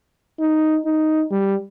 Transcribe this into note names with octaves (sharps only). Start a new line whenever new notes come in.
D#4
D#4
G3